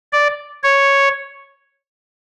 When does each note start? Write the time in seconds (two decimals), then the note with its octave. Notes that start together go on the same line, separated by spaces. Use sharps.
0.13 D5
0.64 C#5